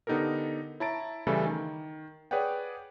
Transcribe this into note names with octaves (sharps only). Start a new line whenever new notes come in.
D3 B3 D#4 G4 A4 A#4
E4 C#5 A5 A#5 A6 D7
C#3 E3 G3 A3 E4 A4
D#3
G#4 B4 C#5 D5 F#5 G5